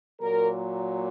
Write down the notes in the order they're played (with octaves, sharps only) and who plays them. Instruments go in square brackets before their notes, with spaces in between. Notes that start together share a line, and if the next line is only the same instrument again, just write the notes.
[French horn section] A#2 F#3 A#3 A#4